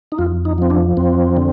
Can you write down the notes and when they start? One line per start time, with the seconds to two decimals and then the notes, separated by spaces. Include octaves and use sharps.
0.12 D#4
0.19 F2 F4
0.45 D#4
0.58 F3 C4
0.70 D4
0.97 F2 C4
1.37 D3